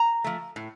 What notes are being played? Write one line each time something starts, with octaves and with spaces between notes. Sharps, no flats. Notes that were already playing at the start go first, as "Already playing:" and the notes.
Already playing: A#5
F3 A3
A2